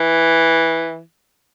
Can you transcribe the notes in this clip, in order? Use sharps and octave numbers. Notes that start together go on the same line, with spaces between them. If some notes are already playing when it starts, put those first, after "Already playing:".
Already playing: E3